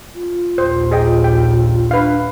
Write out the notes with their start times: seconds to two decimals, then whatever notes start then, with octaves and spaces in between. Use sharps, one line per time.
0.15 F4
0.58 A#1 D#2 C5
0.91 F4 G#4 D#5 G5
1.24 G5
1.91 D4 B4 F5